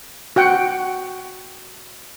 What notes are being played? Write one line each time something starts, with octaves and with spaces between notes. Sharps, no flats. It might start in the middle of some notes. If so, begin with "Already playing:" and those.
F#4 F#5 G5